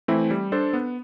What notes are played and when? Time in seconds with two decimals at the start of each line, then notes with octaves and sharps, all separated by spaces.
0.08 E3 A3 C4 E4
0.31 G3
0.52 D4 A4 C5
0.73 B3